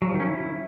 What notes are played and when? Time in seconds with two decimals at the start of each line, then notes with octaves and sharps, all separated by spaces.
0.02 F#3
0.08 F3
0.14 D#3
0.20 C#4
0.26 E4